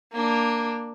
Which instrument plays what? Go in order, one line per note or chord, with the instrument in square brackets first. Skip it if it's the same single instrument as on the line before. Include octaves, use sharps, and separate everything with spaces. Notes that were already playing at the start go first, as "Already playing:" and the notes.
[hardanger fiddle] A#3 D4